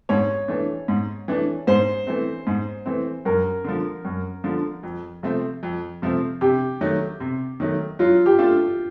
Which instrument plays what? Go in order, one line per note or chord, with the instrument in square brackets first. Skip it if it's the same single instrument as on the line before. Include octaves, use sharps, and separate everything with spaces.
[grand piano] G#2 [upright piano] C#5
[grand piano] E3 A3 D4
G#2
E3 A3 D4
[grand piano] G#2 [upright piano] C5
[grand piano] E3 A3 C4
G#2
E3 A3 C4
[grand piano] F#2 [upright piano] A#4
[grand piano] D3 F3
F#2
D3 F3
F2
C3 F3 A3 C4
F2
C3 F3 A3 C4
[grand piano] C3 [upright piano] G4
[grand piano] D#3 F#3 A3
C3
D#3 F#3 A3
[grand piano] F#3 [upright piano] F4
[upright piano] G4
[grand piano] A3 D4 F4 A4